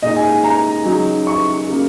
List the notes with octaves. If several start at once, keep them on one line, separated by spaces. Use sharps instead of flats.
A#2 G#3 D#4 D#5
G#5
A#5
C#3 F#3 D#4
C#6
C#3 A#3 C#4